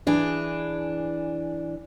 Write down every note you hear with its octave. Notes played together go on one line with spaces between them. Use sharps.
E3 D4 G#4